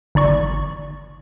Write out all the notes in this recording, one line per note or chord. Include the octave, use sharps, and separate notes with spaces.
G1 D#4 D5 C#6